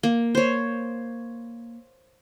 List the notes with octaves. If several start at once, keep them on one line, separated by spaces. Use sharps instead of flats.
A#3
C5 C#5